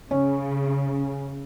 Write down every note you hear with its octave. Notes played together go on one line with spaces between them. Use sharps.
C#3 C#4